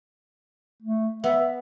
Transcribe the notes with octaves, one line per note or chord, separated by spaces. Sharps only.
A3
B3 E5